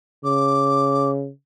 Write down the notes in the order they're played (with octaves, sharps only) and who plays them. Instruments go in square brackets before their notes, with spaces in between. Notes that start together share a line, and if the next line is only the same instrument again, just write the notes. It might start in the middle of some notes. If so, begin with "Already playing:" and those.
[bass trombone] C#3 [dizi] D6